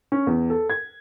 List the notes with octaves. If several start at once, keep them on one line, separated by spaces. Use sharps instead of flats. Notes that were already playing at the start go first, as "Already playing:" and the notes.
C#4
E2
A4
G#6